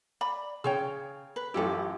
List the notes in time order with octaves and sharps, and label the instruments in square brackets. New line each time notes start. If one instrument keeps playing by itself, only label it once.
[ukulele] D5 B5
[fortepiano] C#3 [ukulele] G#4 C#5 G5
[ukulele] B4
[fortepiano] A1 F#2 G4 [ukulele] E4 F4 A4